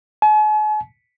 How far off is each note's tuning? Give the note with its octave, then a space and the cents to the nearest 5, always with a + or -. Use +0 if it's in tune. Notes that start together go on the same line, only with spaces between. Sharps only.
G#5 +45